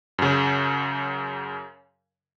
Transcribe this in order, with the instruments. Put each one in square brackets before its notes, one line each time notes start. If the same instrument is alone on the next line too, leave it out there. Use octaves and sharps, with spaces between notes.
[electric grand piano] F#2 C#3